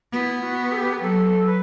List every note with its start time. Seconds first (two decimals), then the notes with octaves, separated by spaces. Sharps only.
0.13 B3 E4 F#4
0.42 F#4
0.72 A4
0.76 G4
0.93 B4
1.01 F#3 A4
1.46 B4